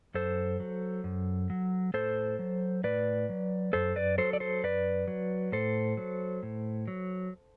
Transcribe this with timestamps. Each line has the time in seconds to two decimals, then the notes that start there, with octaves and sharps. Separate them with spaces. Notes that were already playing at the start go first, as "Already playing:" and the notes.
0.14 F#2 A4 C5
0.60 F#3
1.04 F#2
1.50 F#3
1.94 A2 A4 C5
2.39 F#3
2.84 A2 B4 D5
3.29 F#3
3.73 F#2 A4 C5
3.96 B4 D5
4.18 F#3 A4 C5
4.33 D5
4.40 A4 C5
4.64 F#2 B4 D5
5.08 F#3
5.52 A2 A4 C5
5.97 F#3
6.43 A2
6.88 F#3